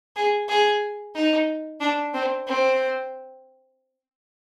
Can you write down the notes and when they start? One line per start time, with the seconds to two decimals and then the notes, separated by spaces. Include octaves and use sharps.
0.16 G#4
0.49 G#4
1.15 D#4
1.80 D4
2.14 C4
2.47 C4